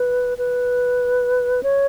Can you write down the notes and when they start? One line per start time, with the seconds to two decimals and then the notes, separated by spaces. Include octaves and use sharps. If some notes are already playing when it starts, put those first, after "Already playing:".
Already playing: B4
0.38 B4
1.63 C#5